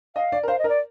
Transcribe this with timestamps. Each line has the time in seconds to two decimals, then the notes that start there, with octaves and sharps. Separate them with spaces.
0.16 D#5 F5
0.32 D5
0.43 A#4
0.48 C5 F5
0.59 D#5
0.64 A#4
0.69 D5